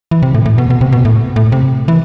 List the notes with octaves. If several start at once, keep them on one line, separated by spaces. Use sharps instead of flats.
E3
C3
A2
A2
B2
B2
C3
B2
A2
A2
C3
E3